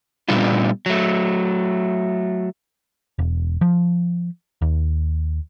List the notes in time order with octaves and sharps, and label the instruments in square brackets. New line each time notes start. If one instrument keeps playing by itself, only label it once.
[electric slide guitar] A#2 G3 A3 B3 D4 F4
F#3 A3
[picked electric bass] E1
F3
D#2